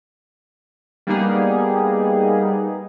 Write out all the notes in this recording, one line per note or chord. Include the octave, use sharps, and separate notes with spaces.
G3 A#3 B3 D#4 G4 G#4